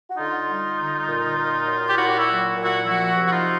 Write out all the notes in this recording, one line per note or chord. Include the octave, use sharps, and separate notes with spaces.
F#4
D3 D#4 F4
G3
D3
A#2
A#2
F#3
G4
A#2 E4 F#4
G4
E4 F#4
F#3
A#2
E4 F#4
F3 E4 F#4
C3
F#4
D#4 F4